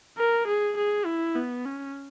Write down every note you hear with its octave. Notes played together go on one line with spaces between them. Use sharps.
A#4
G#4
G#4
E4
B3
C#4